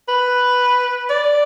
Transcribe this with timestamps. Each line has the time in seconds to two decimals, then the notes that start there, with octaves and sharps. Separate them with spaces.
0.08 B4
1.10 D5